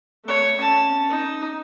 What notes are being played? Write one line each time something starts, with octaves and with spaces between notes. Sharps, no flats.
A3 C#5
C#4 A5
D#4